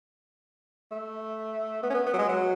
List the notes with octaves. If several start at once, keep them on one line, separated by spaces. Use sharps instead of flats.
A3
B3
C#4
B3
B3
F#3
G#3
F#3